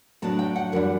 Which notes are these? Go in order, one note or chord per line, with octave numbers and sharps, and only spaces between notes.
A2 F#3 B3 D4 A5
G5
F#5
F#2 E3 G3 D4 F#5